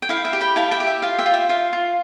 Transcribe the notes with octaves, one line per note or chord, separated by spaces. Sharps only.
G5
E4 F5
E5 G5
G4
G5 B5
E4 F5 A5
E5 G5
G4
E5
F4 F5
E5 G5
F4
E5
F4 F5
F4